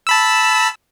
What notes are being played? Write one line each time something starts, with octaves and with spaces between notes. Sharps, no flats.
A5 B5 E6